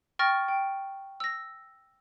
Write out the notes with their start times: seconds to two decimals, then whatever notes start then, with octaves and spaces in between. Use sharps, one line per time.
0.19 G5 C#6 F6 A6 A#6
0.48 G5
1.20 E6 A#6